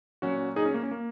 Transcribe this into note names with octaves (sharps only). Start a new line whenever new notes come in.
A#2 F#3 C#4 F#4
D#4 G#4
C#4
A#3
C#4
A#3